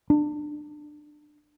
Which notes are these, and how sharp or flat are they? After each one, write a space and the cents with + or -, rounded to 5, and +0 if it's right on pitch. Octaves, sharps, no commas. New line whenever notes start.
D4 +25